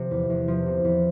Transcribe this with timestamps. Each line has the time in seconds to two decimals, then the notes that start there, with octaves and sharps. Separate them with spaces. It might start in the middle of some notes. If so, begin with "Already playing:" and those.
Already playing: C3 F3
0.11 E2
0.30 E2
0.48 F3
0.66 C3
0.84 E2